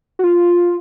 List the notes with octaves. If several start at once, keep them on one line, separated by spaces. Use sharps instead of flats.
F#4
F4